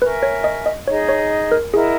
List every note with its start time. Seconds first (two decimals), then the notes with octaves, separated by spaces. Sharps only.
0.02 A#4 B4 E5 G#5 C#6
0.23 C#5
0.44 D#5
0.66 D#5
0.87 D#4 G#4 C#5 D#5
1.09 C#5
1.52 A#4
1.73 E4 G#4 A#4 D#5 F#5